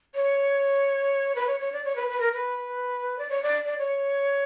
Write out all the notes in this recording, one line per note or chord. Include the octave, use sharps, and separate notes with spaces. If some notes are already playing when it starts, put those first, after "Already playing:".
C#5
B4
C#5
C#5
D5
C#5
B4
B4
A#4
B4
D5
C#5
D5
D5
C#5